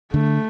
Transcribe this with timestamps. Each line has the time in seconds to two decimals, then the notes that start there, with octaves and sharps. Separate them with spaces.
0.13 D3 A3